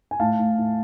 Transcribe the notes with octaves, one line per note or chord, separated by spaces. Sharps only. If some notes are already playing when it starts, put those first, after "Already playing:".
G#5
A2 F5 A5
A2
A2